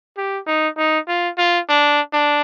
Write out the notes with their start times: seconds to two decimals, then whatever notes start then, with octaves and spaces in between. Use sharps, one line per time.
0.18 G4
0.47 D#4
0.78 D#4
1.08 F4
1.38 F4
1.69 D4
2.13 D4